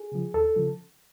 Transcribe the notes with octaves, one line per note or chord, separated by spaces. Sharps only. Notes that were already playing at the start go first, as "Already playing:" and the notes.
Already playing: G#4
C#3 F3
D#2 A4
C#3 F3